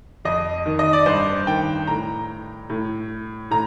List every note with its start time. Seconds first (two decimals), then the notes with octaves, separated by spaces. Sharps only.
0.25 F2 D#5
0.66 D#3
0.79 D#5
0.93 D5
1.06 G2 C5
1.47 D#3 G5
1.87 A2 A#5
2.70 A2
3.51 A2 A#5